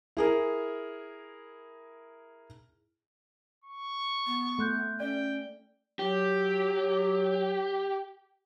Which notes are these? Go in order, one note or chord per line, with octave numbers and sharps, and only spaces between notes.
E4 G#4 A#4
C#6
B3
A3 C6 F#6 G6
C#4 D5 G5
F#3 G4